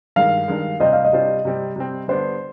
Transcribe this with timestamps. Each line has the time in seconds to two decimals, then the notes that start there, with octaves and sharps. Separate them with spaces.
0.16 G2 D#3 G#3 F5
0.48 G2 D#3 G#3
0.80 C3 G3 D4 F4 C5 D#5
0.93 F5
1.05 D#5
1.13 C3 G3 D4 F4 C5
1.45 C3 G3 C4
1.76 C3 G3 C4
2.08 D3 G3 B3 D4 C5